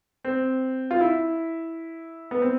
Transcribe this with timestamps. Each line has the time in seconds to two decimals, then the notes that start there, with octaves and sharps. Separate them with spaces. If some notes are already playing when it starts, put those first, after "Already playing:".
0.25 C4
0.91 F4
1.01 E4
2.31 B3
2.42 C4